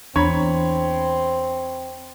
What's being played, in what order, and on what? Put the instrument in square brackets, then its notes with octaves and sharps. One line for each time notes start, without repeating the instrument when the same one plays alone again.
[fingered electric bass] E2 [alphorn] C4 [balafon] D4 [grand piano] C#5 B5